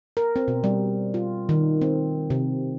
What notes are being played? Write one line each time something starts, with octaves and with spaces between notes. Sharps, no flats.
A#4
C4
B2
G3
F4
D#3
C4
C3